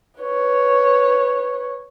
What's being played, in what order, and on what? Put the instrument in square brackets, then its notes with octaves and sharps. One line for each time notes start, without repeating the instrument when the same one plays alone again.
[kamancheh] B4 C#5